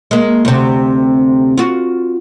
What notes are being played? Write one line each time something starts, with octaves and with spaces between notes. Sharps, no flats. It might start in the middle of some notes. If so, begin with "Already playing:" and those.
G#3 A#3
D2 C3
F4 F#4